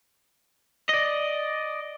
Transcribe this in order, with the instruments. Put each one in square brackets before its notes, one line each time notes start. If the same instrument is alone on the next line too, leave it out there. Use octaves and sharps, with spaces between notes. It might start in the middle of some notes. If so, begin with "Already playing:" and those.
[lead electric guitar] D5 D#5